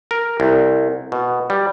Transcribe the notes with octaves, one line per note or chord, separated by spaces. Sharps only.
A#4
C2
B2
G3